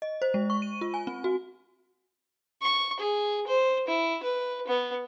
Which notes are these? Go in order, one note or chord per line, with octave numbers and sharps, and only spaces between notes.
D#5
C5
G#3
C#6
D#7
F4
G#5
C4
F#4
C#6
G#4
C5
E4
B4
B3